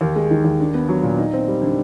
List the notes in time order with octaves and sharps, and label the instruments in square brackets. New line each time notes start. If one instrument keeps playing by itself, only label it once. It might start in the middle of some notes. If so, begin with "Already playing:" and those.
[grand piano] D#2
G#3
D#3
D#2
D4
B3
F#3
A#2
D#4
C4
G3
D3